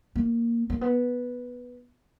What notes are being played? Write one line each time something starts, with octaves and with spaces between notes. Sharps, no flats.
A#3
A#3
B3